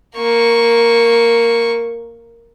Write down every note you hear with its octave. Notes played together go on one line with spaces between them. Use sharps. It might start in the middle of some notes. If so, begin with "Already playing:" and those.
A#3 C#6